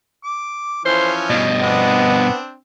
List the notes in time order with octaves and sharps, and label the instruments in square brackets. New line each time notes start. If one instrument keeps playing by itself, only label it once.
[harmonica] D6
[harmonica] E3 F3 C#4 [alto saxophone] C5
[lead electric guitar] G2 B2 [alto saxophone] D#5
[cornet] B3 [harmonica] C4 D4